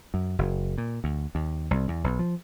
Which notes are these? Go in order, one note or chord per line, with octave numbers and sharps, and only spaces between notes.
F#2
F#1
A#2
D2
D#2
C2
E2
B1
F3